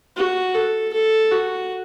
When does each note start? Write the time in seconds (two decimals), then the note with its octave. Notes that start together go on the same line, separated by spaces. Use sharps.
0.17 F#4
0.55 A4
0.93 A4
1.31 F#4